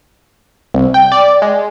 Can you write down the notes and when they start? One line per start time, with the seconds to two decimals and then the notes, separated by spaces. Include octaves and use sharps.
0.74 C2
0.94 G5
1.12 D5
1.42 G#3